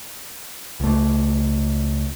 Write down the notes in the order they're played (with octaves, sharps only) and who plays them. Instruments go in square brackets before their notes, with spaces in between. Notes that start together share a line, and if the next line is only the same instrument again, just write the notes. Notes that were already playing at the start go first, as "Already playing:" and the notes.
[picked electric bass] C#2 A3